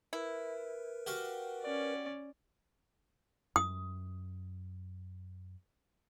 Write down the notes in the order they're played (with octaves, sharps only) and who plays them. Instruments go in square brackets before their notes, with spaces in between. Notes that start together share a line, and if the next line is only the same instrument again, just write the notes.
[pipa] E4 [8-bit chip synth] A#4 B4
[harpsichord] F#4 G4 F5
[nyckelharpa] C#4 D5
[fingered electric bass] F#2 [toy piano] D#6